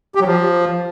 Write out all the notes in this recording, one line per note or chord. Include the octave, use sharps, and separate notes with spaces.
G4
F#3
F3